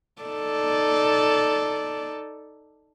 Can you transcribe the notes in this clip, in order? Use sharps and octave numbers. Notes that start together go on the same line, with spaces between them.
D#4 A4 D5